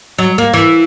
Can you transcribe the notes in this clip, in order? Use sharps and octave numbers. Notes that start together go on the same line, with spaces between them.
F#3
A#3
E3